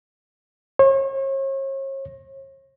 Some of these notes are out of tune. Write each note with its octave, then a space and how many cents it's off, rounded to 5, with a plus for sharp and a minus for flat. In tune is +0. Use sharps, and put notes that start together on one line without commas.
C#5 -40